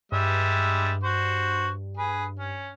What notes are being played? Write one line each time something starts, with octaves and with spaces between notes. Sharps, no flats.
G2 G3 G#3 E5
F#4 C5
G#4 B4
C#4